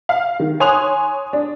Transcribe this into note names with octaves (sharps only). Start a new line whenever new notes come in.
F5
D#3
C#5 G#5 C6 D#6 F#6 F7
D4